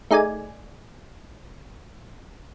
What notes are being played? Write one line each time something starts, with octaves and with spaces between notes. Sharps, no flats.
A3 D#4 G#4 D5 G#5